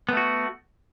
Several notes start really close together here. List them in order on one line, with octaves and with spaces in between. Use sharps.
B3 A3 F#4